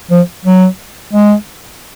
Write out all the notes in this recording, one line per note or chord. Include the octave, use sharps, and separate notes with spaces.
F3
F#3
G#3